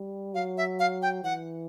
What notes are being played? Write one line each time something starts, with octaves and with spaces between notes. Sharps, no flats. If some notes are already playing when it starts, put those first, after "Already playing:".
Already playing: G3
F#3 F5
E5
F5
G5
E3 F#5